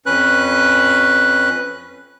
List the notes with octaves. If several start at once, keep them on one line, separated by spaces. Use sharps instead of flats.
F2 C#4 B4 F#6